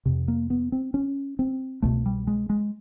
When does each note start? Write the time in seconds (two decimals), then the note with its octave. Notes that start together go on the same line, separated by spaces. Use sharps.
0.06 F2 C3
0.28 A#3
0.50 B3
0.72 C4
0.94 C#4
1.39 C4
1.82 C2 B2 A3
2.06 G3
2.27 G#3
2.50 G#3